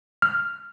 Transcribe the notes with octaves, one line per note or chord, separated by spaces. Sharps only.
F6